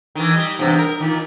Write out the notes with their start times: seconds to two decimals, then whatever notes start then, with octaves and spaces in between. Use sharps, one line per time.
0.15 D#3 E3
0.35 G3
0.59 E2 G2 C3
0.79 A#4
1.00 A#2 D#3